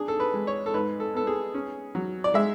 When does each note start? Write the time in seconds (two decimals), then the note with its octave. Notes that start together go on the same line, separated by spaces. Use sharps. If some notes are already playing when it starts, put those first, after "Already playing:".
Already playing: D4 G#4
0.08 A4
0.20 B4
0.34 G#3
0.47 C#5
0.66 A4
0.74 G#2 B4
1.00 A4
1.14 B3 A4
1.27 G#4
1.54 C#4
1.95 F#3
2.24 D5
2.34 G#3 E5